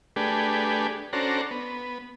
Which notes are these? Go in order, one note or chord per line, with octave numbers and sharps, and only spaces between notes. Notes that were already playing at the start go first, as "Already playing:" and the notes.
A3 D4 G4 G#4 B4
C#4 D4 F#4 A4 C5 A#5
B3